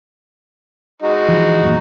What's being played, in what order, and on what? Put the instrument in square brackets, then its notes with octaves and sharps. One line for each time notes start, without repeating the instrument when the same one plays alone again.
[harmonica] G#3 D#4 F#4
[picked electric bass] E3 F3
E1 F#2 A#2